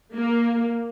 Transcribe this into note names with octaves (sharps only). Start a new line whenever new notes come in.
A#3